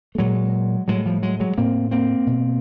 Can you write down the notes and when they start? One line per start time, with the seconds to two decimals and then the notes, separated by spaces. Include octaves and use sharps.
0.15 A3
0.18 A#2 F#3 G#3
0.88 A2 F#3 G#3
1.06 F3 G3
1.23 F#3 G#3
1.40 F#3 G#3
1.58 A2 A#3 C4
1.91 A#3 C4
2.27 B2